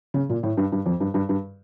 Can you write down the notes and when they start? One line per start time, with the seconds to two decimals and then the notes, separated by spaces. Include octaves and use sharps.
0.14 C#3
0.30 A#2
0.43 A2
0.57 G2
0.72 G2
0.86 F2
1.00 G2
1.14 G2
1.29 G2